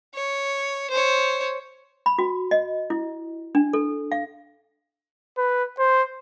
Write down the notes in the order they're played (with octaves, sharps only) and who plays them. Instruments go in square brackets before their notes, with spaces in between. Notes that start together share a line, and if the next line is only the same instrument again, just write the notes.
[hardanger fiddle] C#5
C5 C#5
[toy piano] B5
F#4
D#5
E4
D4
A4
F5
[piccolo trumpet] B4
C5